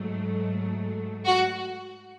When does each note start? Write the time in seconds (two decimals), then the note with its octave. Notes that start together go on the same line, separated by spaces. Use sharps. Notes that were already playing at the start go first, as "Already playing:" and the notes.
Already playing: G#2 F#3 A3
1.26 F#4